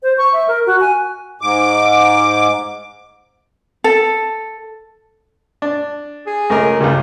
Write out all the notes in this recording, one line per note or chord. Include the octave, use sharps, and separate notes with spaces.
C5
C#6
E5
A#4
F#4
G#5
G#2 D6
A4
D4
G#4
C#2 A3 A#4
C#2 G2 C#3